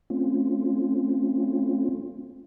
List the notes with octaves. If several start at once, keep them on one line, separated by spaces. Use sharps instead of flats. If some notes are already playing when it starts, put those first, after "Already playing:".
A3 C4 C#4 F4